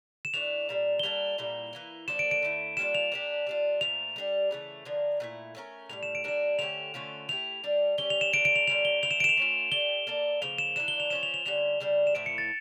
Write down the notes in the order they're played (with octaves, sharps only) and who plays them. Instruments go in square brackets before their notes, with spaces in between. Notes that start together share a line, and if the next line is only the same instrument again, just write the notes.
[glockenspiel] E7
[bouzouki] E3 A3 D4 [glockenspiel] F7
[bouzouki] A#2 G3 D4
[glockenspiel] G7
[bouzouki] G3 A#3 D4 A4 [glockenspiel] F7
[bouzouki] A#2 G3 A#3 E4
E3 A#3 E4
[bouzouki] F3 A#3 D4 A4 [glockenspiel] E7
[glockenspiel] D7
D7
[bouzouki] D3 A3 E4
[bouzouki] G3 A#3 D4 F4 [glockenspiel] E7
[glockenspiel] F7
[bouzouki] A#3 D4 G4
G3 D4 F4
[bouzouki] A#2 F3 A3 [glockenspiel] F7
[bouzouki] G3 D4 G4
C#3 E3 A3
D3 F3 A#3 D4
A#2 A3 E4
A3 C#4 F4 A#4
[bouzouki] A2 E3 G3 [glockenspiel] F7
[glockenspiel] E7
D7
[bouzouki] G3 A#3 D4 [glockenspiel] E7
[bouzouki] D3 A3 C#4 G4 [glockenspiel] F7
[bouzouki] D3 A3 C#4 F4
[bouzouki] A3 E4 G4 [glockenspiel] F7
[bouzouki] G3 D4 G4
[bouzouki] G3 C#4 G4 [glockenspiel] G7
[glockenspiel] F7
E7
[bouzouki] C#3 E3 A#3 D4 [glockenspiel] D7
[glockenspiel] D7
F7
[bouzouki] D3 G3 A#3 C#4 [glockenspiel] F7
[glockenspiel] G7
[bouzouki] D3 A3 E4 [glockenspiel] F7
[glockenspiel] E7
D7
E7
F7
[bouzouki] A3 C#4 F4
[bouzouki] A3 D4 G4 [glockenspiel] G7
[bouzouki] A#3 D4 A4
[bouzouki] C#3 F3 A#3 [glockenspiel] F7
[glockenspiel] E7
[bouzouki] E3 A#3 D4 [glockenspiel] E7
[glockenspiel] G7
F7
[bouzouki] F3 C#4 F4 [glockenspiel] E7
[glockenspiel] F7
F7
[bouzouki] D3 G3 C#4 [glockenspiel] F7
[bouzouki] C#3 G3 D4
[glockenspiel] E7
[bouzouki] A2 F3 A3 E4 [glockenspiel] D7
[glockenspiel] C#7
A6